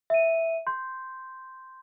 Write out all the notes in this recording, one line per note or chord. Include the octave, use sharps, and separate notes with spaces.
E5 D#7
C6 G6